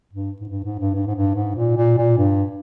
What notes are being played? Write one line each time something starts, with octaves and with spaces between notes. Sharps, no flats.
G2
G#2
G2
G#2
G2
G2
G#2
G2
G#2
A#2
A#2
A#2
G2